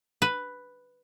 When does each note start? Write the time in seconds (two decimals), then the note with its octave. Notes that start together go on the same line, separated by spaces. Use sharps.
0.22 B4